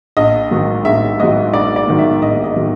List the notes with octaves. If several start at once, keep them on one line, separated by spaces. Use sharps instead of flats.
A#1 D#5
G#2 D#3 F#3
A#1 E5
G#2 D#3 F#3 D#5
A#1 D5
D5
G#2 D#3 F#3
E5
A#1 D#5
D#5
D#3 F#3